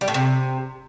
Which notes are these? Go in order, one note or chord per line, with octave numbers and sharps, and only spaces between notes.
G3
A2
C3